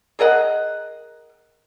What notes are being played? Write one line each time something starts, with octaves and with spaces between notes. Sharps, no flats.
G#4 A#4 D#5 F#5